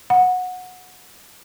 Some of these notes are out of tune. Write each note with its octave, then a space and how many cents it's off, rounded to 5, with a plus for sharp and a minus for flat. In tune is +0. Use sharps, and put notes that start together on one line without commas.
F#5 -15